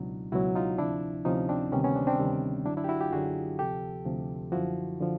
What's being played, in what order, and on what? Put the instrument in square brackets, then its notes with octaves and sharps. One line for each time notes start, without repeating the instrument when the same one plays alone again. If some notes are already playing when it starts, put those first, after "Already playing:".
Already playing: [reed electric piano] C#2 B2 F#3 D4 E4
C#2 B2 F#3 E4 F#4
D#4 F4
D2 C3 F3 D4 E4
D2 C3 F3 C#4 D#4
C4 D4
D2 C3 D#3 G3 B3 C#4
B3 C#4
C4 D4
C4 D4
D2 C3 D#3 G3
F#2 D3 F#3 D4 E4
D4 E4
G4
E4 F#4
F4 G4
F#2 D3 F#3 F#4 G#4
D2 C3 F3 G4 A4
D2 C3 F3
F#2 D3 F3 E4 F#4
D3 F3